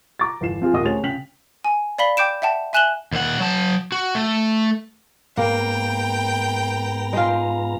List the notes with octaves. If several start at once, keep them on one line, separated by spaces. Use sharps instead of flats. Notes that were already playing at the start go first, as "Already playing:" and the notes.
A#5 D6 A6
G1 E2 C7 E7
F3 C4 F4 G#4
D#2 A#2 A#3 D#5 F#5 D#6
D2 C#4 G#4 C#5 A6 F7
C#3 G5 B6 F7 F#7
G#5
D5 F5 B5 B6 G7
G5 D6 G6 D7 E7
E5 F#5 G5 A5
E5 G#5 F#6 E7 F#7 G7
D#2 F#5
F#3 A5
F#4
A3
G#2 A#3 B3 G5 A#5
G#3 F4